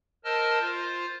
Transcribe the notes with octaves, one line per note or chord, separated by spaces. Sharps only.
A#4 C5 D#5 A5 E6 F6
F4 C5